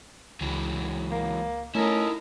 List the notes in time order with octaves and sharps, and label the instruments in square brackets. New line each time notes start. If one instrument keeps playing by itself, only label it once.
[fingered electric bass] C#2 [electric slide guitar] E3 F#3 G#3
[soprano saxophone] A#3
[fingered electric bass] A3 [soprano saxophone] C#4 [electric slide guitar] E4 F4 [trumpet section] A4 A#4 D#5